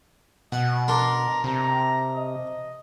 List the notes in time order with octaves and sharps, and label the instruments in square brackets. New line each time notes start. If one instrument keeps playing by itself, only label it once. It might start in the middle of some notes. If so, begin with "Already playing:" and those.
[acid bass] B2 [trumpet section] D#5 [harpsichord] F#5
[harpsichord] D4 A#4 C6 [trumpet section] A#5
[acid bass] C3 [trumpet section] A#5
[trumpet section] D#5